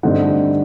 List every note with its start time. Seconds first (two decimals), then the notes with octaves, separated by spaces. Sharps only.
0.03 G2 D3 A3 C4 D#4 F#5